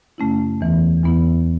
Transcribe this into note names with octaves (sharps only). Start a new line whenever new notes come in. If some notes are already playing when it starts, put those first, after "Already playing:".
F#2 C#3 A3 C#4 E4
E2 E3 B3 E4
E2 E3 B3 E4